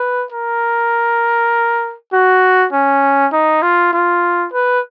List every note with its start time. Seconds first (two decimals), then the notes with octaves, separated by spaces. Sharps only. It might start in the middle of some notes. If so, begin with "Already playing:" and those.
Already playing: B4
0.32 A#4
2.13 F#4
2.73 C#4
3.32 D#4
3.62 F4
3.93 F4
4.53 B4